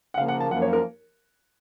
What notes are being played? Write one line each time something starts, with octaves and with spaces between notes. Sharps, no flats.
F#5
C#3 F3 A#3 F5
F#5
A5
F#2 F3 A#3 F#5
C#5
A#4